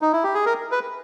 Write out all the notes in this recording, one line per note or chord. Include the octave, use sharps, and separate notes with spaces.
D#4
E4
G4
G#4
A#4
B4